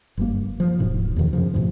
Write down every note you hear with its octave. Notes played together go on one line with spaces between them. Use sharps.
F#1 G2 A#3
F3
D1 G#2 B2
E2 B2 D#3 F3
F#2 C#3 F3
D2 G#2 B2 F3